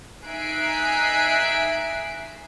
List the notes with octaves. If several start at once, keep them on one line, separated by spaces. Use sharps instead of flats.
D#4 E5 G#5 F#6 C7 D7